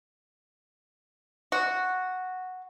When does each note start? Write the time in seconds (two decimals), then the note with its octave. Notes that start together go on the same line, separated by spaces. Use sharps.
1.52 F#4